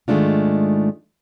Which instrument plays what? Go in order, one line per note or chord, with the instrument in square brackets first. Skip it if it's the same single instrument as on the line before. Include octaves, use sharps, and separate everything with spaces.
[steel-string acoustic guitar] G#2 D#3 G#3 A3 D4 F4